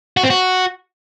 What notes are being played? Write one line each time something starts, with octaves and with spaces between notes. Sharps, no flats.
F#4
C4
F#4